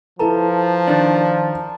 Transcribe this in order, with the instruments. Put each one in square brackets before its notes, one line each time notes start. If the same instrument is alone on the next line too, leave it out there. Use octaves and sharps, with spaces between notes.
[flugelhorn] F3 [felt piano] E4 A4 B4 [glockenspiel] A5 A#5
[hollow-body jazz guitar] D#3 D4